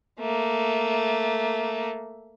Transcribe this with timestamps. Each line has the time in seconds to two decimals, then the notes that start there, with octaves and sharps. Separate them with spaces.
0.19 A3 A#3